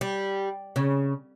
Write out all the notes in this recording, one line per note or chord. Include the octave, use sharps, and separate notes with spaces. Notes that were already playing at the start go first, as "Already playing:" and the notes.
G3
C#3